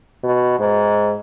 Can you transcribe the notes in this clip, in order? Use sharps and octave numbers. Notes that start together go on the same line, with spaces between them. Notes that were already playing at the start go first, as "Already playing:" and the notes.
B2
G#2